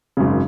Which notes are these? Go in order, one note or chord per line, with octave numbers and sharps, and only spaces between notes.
G#1 F#2 C#3